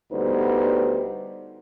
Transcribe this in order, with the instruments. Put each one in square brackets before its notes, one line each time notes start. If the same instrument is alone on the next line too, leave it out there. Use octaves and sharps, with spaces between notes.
[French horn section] D2 G3 B3 D#4 B4 C5